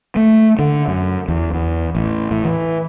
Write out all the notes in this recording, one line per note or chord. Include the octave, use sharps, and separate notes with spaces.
A3
D3
F#2
E2
E2
A1
A2
E3